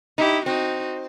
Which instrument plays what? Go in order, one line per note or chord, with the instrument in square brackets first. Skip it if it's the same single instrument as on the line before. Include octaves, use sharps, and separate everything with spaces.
[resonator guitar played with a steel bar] D#4 [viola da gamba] E4 G4
[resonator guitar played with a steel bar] C4 [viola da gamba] D#4 F#4